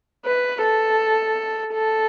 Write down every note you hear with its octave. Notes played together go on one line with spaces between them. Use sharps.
B4
A4
A4